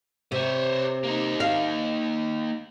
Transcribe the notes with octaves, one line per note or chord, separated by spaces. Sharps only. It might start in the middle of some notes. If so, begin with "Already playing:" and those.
C3 C5 C#5
A#3 D#4
F5